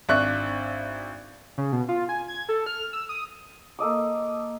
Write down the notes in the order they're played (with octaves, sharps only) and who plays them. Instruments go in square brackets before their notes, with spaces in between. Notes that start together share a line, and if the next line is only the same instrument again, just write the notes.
[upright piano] G#1 D4 E5 C#6 F#6
[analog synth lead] C#3
B2
F4
G#5
G#6
A4
F6
E6
D#6
[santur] A#3 A4 D#5 D6